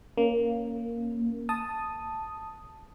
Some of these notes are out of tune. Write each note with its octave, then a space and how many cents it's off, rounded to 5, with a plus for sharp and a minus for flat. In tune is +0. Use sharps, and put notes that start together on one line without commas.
A#3 +0 C#4 +0
A5 +0 D#6 +0